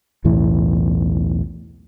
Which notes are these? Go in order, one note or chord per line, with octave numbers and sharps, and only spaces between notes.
B1 E2 A2 E3